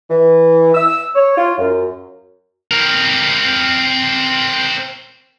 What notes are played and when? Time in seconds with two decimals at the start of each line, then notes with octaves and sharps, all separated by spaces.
0.10 E3
0.75 E6
1.15 C#5
1.38 F4
1.59 F#2
2.71 C4 A#4